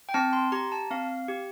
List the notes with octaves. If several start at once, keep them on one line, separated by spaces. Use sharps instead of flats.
G5
C4 A5
C6
G4 A#5
A5
C4 F5
G4